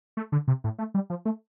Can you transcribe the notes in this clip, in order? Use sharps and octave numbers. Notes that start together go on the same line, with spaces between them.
A3
D3
C3
A2
A3
G3
F3
A3